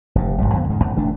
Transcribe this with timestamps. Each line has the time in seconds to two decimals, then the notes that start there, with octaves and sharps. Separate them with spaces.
0.15 F1 G2
0.39 D#1 C2 G#2 G3
0.53 E2 D3 A#3 B3
0.68 E1 G#2 C#3 G#3
0.84 C2
0.96 F1 E3 A3 D4